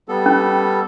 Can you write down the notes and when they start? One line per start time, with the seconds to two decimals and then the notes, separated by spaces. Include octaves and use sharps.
0.08 G3 B3 A4
0.26 C#4